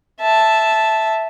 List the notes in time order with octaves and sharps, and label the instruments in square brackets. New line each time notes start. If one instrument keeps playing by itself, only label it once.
[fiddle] E5 A5